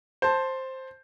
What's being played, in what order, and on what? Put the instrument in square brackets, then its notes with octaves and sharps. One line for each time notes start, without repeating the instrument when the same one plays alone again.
[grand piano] C5 A5